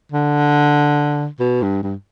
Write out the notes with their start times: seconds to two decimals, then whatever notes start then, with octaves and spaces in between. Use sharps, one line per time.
0.12 D3
1.40 B2
1.62 G2
1.83 G2